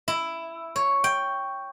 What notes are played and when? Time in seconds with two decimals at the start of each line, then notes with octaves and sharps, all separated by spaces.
0.08 E4
0.76 C#5
1.04 G5